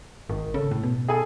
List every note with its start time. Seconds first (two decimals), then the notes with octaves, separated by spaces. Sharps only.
0.29 G#1 D#3
0.54 C#3 A4
0.71 A2
0.83 B2
1.08 G#4 A4 G#5